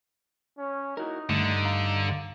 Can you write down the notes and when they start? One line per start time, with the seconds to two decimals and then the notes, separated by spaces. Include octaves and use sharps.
0.58 C#4
0.97 D#4 E4 F#4 A#4
1.30 G2 D3 D#3 A3
1.65 F5 A#5